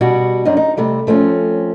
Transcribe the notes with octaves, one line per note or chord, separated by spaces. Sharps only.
B2 G3 F#4
F#2 D4 D#4
D#4
C3 G3 A3
F3 A3 C4 C#4